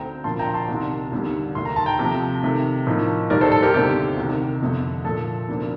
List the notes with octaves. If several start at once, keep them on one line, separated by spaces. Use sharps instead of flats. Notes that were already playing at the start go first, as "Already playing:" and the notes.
Already playing: D2 D3 A3 C4 G5 A#5
A#2 F3 A#3 D4 A5 C6
G5 A#5
A5 C6
C2 C3 D#3
D#2 D3 G3
D#2 D#3 A3 C6
A#5
A5
G5 A#5
C3 F3 A3
C3 D#3 A3
A2 F3 A#3 D#4
D#2 D#3 G3 A#4 D5
A4 C5
A4
G4 A#4
D#2 D3 A3 C4 G4
C2 C3 D#3
F2 D3 A3 D4
A#2 F3 A3 A4
D2 D3 F3 A#3 D4